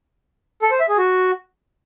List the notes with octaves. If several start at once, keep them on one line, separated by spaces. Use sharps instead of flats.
A4
C5
E5
G#4
F#4